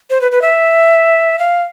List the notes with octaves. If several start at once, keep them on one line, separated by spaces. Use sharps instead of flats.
C5
B4
B4
E5
F5